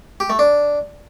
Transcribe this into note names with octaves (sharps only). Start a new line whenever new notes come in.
G4
A3
D4